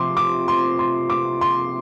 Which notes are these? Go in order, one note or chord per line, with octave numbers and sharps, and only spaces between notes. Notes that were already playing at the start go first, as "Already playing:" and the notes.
Already playing: C3 F3 C6 D6
D6
C6
C6
D6
C6